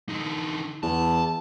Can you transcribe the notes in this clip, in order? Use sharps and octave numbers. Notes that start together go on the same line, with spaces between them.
D3 D#4
E2 A5